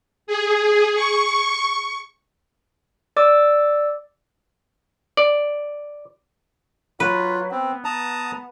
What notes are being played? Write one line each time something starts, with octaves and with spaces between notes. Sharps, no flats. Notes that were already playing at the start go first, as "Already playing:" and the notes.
G#4
C#6
D5 D6 E6
D5
F#3 F4 B4
B3 C4
A5 A#5 D#6